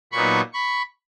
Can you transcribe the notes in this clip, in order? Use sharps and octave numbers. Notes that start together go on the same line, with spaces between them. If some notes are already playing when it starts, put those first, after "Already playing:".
A#2 F#3 B3 D#4 B5 C#6
B5 C#6